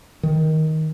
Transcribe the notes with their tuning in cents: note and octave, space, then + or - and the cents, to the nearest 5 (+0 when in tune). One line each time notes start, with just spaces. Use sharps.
D#3 +15